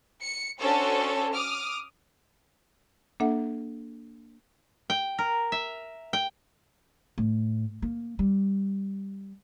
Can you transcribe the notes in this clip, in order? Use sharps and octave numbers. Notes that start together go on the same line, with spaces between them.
C#7
C#4 D4 F#4 A4 C5 C#5
D6 D#6 F6
A#3 D4 A4 E5 F#5
G5
A#4
E5
G5
A2
A#3
G3